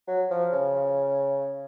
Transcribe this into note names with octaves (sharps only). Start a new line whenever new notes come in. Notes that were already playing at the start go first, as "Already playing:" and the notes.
F#3
F3
C#3